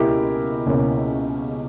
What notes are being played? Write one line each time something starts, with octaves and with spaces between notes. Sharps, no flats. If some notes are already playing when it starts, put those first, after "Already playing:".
Already playing: C#2 B2 A#3 C#4 E4 G4 A#4
C#2 B2 A#3 C#4